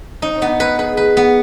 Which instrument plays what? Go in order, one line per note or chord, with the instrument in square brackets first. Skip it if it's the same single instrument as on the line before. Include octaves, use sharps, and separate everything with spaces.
[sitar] C4 [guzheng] D#4
[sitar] C4
[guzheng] B3 [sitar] D4
[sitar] C4 [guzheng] B4
[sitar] G#4 [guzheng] B4
[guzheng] B4
B3